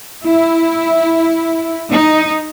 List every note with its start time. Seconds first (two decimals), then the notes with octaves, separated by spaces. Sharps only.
0.25 E4
1.90 D#4